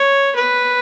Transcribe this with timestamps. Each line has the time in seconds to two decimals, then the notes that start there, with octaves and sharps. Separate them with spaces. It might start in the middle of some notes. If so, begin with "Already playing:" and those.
Already playing: C#5
0.36 B4